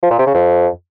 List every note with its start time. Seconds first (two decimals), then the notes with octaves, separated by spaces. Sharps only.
0.02 F3
0.10 A#2
0.18 C3
0.26 C#3
0.34 F2